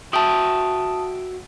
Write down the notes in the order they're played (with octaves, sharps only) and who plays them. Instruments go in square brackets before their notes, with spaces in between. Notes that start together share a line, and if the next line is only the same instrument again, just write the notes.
[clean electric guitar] F#4 E5 G5 [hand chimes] A5 D#6